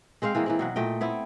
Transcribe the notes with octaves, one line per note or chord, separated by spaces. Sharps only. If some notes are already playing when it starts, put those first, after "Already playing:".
G#3 C4 C5 F5
E3 G#3 A#3
E3 A#3 C4
B2 F#3 F#5
A#2 A3 D#5 G5
B3 C4 E4